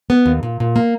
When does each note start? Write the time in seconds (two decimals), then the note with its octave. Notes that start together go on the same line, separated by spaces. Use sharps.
0.10 B3
0.26 D#2
0.43 A#2
0.60 A#2
0.76 A#3